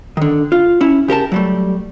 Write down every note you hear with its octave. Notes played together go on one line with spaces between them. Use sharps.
D3 D#3
F4
C#4 E4
C#3 G4 A#4 A5
F#3 G3 A3